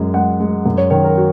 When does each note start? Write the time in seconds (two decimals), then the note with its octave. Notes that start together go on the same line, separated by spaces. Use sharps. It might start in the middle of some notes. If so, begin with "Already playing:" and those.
Already playing: F#2 G#3
0.14 G#3 F#5
0.40 G#3
0.66 F#2
0.78 C#5
0.90 D#3 C#5
1.04 A#4
1.17 F#4